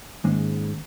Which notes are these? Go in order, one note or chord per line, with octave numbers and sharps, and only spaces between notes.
G#2 D#3 G#3 A#3 C#4